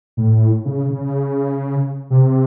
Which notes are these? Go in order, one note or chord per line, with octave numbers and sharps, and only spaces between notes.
A2
C#3
C#3
C3